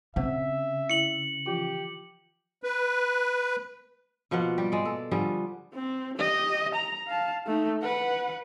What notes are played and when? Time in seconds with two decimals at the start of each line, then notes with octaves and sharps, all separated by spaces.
0.16 C#3 C4 C5 E5 F#5
0.90 E4 C#7 F#7
1.46 E3 F3 F4 G4
2.63 B4
4.31 B2 F3 A#3 F#5
4.58 G3 G4
4.72 G#3 D5
4.85 A4
5.11 D3 F3 G3 G#4
5.74 C4
6.18 G4 D#5
6.75 A#5
7.07 F5 A5
7.46 A3 D#4
7.82 B4 F#5